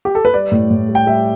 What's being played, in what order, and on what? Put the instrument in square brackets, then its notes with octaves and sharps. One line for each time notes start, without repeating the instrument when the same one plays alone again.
[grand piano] G4
A4
B4
G3 D5
A2
A2
G3
G5
G3 E5